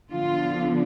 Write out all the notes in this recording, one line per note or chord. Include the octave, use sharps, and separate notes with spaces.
D3 F3 B3 D4 F4